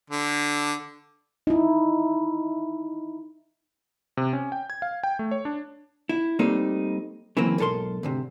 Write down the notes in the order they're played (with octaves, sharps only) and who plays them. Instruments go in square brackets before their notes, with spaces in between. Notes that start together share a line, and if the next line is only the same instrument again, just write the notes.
[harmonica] D3
[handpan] D#4 E4
[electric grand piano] C3
C#4
G5
G#6
F5
G5
A3
C#5
D4
[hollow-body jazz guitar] E4
G3 A3 A#3 C4 D#4
C#3 E3 F#3 A#3 C4
B1 G#2 A4 A#4 C6
D2 G#2 C3